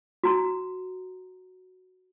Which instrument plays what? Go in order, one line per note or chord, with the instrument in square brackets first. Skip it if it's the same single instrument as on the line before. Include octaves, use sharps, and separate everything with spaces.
[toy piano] F#4 A#5